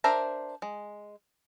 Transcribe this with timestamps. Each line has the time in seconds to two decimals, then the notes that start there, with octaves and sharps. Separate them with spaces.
0.04 D4 A#4 C5 E5 A#5
0.62 G#3